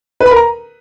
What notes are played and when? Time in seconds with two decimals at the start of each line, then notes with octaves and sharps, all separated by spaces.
0.20 B4
0.26 B5
0.31 A#4
0.36 A#5